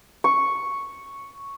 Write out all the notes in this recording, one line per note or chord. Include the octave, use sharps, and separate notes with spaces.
C#6